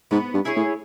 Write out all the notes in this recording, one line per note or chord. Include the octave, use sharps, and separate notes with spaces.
G#2 B3
G2
E4 G#4 C#5
A2